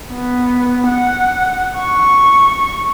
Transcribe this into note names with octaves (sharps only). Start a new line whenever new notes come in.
B3
F#5
C#6